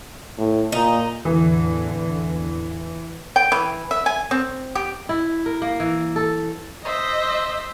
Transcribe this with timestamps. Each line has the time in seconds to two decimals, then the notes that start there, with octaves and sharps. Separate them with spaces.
0.38 A2
0.72 A#2 D#4
1.25 E2 A2 D3 E3
3.36 G5
3.52 E3
3.91 E5
4.06 G#5
4.31 C4
4.75 G4
5.09 E4
5.46 A#4
5.62 A#3
5.80 E3
6.16 A4
6.85 C5 D#5 E5